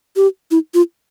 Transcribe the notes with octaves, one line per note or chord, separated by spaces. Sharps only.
G4
E4
F4